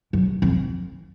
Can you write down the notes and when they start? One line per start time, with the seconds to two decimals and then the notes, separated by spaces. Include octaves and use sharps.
0.13 F#2
0.42 F2